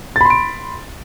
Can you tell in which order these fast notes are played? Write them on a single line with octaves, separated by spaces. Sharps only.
A6 B5 C6 D7